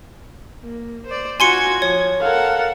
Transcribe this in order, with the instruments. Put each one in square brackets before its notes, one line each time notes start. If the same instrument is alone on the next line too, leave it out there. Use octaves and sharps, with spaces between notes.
[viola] A#3
C5 D5
[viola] F4 F#4 [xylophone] G#5 C6 C#7 [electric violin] G#6
[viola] F3 [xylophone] C#5
[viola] A4 F#5 [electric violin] A#4 F5